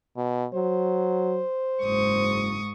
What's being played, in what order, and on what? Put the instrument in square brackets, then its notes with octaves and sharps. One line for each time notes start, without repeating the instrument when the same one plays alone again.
[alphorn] B2
[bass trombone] F#3 [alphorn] C5
[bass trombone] F#1 [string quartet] G#2 C#6 D#6